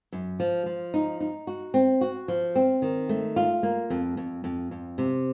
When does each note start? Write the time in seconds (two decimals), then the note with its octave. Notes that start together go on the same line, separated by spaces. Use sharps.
0.13 F#2
0.40 F3
0.66 F3
0.94 D#4
1.20 D#4
1.47 F#4
1.74 C4
2.01 F#4
2.28 F3
2.56 C4
2.82 D#3
3.09 A3
3.36 F4
3.63 A#3
3.90 F2
4.17 F2
4.44 F2
4.71 F2
4.98 C3